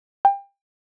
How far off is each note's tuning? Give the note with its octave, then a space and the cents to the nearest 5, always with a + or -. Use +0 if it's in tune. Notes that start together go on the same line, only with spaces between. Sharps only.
G5 +25